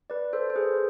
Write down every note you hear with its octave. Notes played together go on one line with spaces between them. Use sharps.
B4 D5
A4 C5
C5
G#4 B4